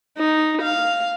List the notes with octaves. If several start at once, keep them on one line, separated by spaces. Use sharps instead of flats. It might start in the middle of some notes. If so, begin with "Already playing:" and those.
D#4
F5